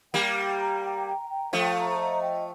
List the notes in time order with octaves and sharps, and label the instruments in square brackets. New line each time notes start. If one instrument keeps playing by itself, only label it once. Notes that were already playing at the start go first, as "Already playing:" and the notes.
[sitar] G3 A#3 [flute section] G5
[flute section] G5
A#5
G5
A#5
G5
[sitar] F3 A3 [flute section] A4
[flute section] A#5
D#5
G5